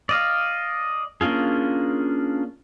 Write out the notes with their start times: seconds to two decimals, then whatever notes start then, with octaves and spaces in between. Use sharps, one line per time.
0.09 D5 D#5 F5
1.21 A#3 C#4 D4 F4 G#4